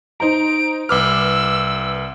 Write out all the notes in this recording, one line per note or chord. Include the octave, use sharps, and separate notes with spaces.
D#4 C5 A#5 D7
C2 B4 D6 E6 F6